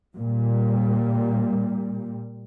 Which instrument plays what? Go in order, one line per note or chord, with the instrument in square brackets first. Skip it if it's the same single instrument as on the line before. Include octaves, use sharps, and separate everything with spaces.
[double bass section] A#2 G3